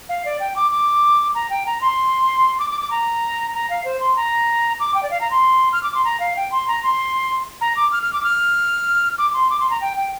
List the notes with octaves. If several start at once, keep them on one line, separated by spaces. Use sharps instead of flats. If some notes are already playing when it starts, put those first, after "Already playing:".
F5
D5
G5
D6
D6
A#5
G5
A#5
C6
D6
D6
D6
A#5
A#5
F5
C5
C6
A#5
D6
G5
D5
F5
A#5
C6
F6
D6
C6
A#5
F5
G5
C6
A#5
C6
A#5
D6
F6
F6
D6
F6
D6
C6
D6
C6
A#5
G5
G5